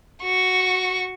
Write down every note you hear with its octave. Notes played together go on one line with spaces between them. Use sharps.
F#4 C#6